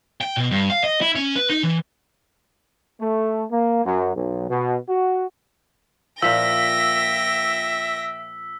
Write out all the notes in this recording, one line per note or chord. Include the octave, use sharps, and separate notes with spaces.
G5
B2
G2
F5
D#5
E4
C#4
B4
D#4
E3
A3
A#3
F#2
B1
B2
F#4
A#2 F3 E5 G5 E6 A#6 B6